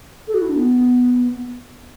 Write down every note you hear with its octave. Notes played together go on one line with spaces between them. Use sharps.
A4
F#4
E4
D4
B3